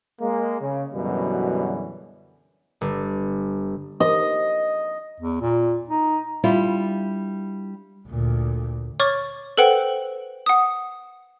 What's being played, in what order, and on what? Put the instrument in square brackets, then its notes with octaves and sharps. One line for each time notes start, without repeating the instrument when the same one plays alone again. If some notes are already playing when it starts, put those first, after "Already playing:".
[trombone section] G#3 A#3
C#3
F#2 B2 D3 E3 F#3 G3
[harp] G1
[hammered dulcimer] D#5
[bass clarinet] E2
A#2
D#4
[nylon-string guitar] G3 D4 E4 F4
[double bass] D2 A#2
[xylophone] C#5 C#6 D6 F6 A6
A4 B4 C5 F#5 G5
F#5 D#6